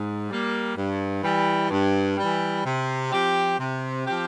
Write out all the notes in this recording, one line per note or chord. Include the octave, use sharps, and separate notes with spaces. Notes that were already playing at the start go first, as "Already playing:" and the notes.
Already playing: G#2
G3 A#3
G2
E3 G3
G2
E3 G3
C3
F3 C4 G4
C3
F3 C4 G4